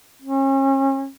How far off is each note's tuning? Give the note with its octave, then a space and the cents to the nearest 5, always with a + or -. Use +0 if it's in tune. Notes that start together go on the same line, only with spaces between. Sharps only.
C#4 -35